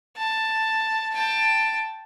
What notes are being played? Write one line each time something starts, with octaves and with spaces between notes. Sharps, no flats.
A5
G5 A5